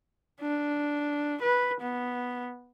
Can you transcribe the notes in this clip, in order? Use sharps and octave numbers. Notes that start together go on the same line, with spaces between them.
D4
B4
B3